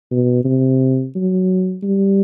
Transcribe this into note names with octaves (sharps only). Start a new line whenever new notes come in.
B2
C3
F#3
G3